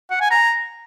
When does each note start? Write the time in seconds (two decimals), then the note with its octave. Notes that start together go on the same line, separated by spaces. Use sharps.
0.11 F#5
0.21 G#5
0.31 A#5